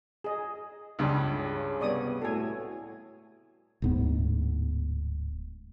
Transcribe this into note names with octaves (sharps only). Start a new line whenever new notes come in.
G#4 D#5
C#2 G2
C#3
C3 G3 B3 C#5 D5 D#6
A2 F#4 A4 G#5
D1 G#2 B3